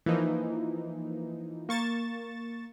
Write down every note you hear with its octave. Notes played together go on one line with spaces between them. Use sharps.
E3 F3 A#3 D#4
A#3 C#6 A6 E7